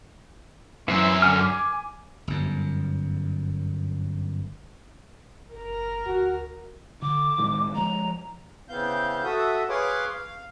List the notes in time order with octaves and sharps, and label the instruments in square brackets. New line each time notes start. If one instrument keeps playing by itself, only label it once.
[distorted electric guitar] F#2 [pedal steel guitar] E3 C4 E4
[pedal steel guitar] D3 G#5 F6
G#5 D6
[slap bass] G1 F#2
[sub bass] F#1 [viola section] A#4
[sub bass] D2 [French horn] F#4
[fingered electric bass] D3 [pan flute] D6
[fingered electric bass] A2 D#3 G#3
[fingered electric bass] F3 G#3 [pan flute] A#5
[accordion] C#3 E3 B3 C4 F5 G6
F#4 A4 E5 D#6
G#4 B4 C#5 F5 C6 D6
F5